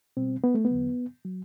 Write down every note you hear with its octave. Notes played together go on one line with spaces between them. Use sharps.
B2 G3 C4
B3
A3
B3
E2 D3 F#3
F#3